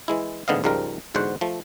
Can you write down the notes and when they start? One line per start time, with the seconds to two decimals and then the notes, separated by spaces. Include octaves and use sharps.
0.08 E3 G#3 E4
0.48 A1 G#2 D3 B3 D#5 F5
0.64 C#2 G#2 F3 G3 A#4
1.15 E2 G#2 D3 F#4 C5 F#5
1.41 F3 A3